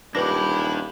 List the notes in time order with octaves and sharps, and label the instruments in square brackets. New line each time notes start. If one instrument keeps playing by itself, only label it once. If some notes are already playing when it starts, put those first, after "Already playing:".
[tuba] D#1 [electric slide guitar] D4 G4 [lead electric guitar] E4 B5 [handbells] B4 A#6